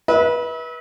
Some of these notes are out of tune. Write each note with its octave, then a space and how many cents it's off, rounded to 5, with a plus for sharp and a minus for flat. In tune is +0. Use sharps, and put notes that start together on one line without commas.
B4 -25 E5 -40